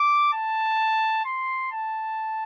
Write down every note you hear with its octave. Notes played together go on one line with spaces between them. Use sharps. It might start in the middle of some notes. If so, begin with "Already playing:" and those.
Already playing: D6
A5
C6
A5